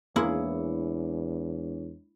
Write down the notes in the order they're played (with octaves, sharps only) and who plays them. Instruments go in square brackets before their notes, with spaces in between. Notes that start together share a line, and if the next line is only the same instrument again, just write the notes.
[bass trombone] E2 [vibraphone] G#3 D4 C#5 [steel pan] A#3 G#4 [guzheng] E4